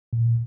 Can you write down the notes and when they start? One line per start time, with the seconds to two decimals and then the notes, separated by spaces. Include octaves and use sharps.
0.13 A#2